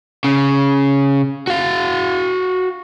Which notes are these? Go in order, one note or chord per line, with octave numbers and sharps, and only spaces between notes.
C#3
F#4 F5